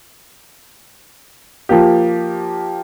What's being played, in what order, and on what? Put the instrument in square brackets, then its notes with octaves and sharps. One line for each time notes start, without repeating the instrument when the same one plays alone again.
[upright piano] F3 A#3 G4